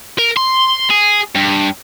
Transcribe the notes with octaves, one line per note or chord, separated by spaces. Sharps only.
A#4
C6
G#4
G2